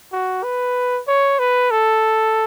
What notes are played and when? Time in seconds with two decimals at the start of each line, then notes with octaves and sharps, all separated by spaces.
0.13 F#4
0.44 B4
1.08 C#5
1.39 B4
1.71 A4